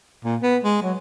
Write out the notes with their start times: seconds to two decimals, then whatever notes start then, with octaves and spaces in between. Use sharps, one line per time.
0.25 A#2
0.43 B3
0.64 G#3
0.82 F#3